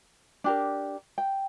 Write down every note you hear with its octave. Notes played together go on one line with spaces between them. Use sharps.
D4 G4 A#4
G5